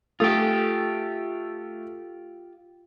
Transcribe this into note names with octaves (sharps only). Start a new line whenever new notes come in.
A3 F4 G4 A4 D#6